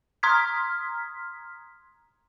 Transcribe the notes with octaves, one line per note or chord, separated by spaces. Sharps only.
A#5 C6 D#6 F6 G#6 B6